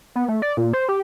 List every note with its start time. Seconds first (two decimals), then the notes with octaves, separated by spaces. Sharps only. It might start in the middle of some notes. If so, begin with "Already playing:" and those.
0.15 B3
0.28 A3
0.42 D5
0.57 A#2
0.73 C5
0.89 G4